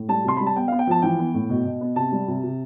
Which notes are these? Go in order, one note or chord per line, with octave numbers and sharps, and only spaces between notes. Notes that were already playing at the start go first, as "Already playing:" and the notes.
Already playing: A2
G3 A5
C3 C6
G3 B5
A5
B3 G5
F5
B3
G5
F3 A5
E3 G5
B3
A2
B2
B2
B3
C3 A5
G3
C3
C3